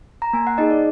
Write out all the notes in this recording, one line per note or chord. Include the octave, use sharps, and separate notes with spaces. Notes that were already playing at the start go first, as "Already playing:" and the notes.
A#5
A#3 G#5
F#5
D#4 G#4 D#5
D5